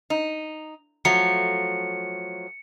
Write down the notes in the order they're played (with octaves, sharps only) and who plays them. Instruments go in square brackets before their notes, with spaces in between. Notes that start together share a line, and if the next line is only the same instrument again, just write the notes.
[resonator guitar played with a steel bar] D#4
[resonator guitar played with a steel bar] F3 F#3 A3 [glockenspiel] C#7